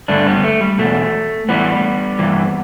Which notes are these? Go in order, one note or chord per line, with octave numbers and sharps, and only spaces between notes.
G2 D3 A3 D4
G3 B3
A3
G3
E2 B2 A3
A2 E3 G3 B3
G2 E3